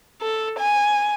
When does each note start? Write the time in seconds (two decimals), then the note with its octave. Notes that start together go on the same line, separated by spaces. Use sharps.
0.21 A4
0.59 G#5